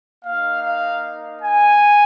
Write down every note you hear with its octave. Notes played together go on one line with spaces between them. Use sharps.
A#3 D#4 F5
F5
G#5